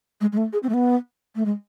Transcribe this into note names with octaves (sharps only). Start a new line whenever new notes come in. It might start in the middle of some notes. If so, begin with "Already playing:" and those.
G#3
G#3
A3
G#4
C4
A3
B3
A3
G#3